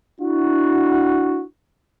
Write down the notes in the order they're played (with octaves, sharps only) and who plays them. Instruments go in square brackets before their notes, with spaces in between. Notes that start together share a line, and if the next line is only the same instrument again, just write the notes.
[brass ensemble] D4 E4 F#4